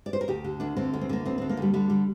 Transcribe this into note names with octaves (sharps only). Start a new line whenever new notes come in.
D5
C5
A#4
D2 G4
D3
D2 D4
D3 C4
D2
C4
D3 A#3
D2 C4
D3 C4
A#3
D2 G3
D3 G3
G3